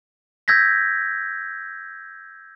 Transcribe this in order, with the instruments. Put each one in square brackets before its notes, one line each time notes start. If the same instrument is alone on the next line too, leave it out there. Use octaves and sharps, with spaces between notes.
[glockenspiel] E6 G6 G#6 A#6 B6